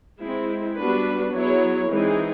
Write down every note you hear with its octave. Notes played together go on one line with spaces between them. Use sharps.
G#3 C4 E4
G3 B3 D4 F#4 B4
F#3 B3 E4 G#4 C#5
E3 G#3 C4 D#4 G#4